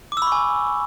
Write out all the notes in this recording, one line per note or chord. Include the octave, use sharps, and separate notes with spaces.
G#5 B5 C#6 D6 E6